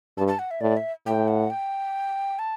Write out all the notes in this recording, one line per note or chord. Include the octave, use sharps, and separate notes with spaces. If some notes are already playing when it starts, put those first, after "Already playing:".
G2 A5
A5
F#5
E5
A2 D5
E5
A2 G5
F#5
G5
A5